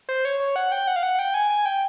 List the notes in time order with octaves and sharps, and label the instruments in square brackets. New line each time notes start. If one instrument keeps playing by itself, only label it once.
[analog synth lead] C5
C#5
C#5
F#5
G5
F#5
F5
F#5
G5
G#5
G#5
G5